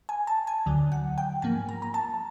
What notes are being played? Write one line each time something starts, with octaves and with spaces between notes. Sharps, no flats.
G#5
A5
G#5
D2 D3 F#3
F#5
G5
G#2 F3 A#3 G#5
A#5
A#5
A5